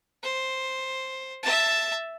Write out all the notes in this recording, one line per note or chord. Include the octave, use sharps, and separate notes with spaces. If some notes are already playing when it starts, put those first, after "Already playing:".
C5
E5 A5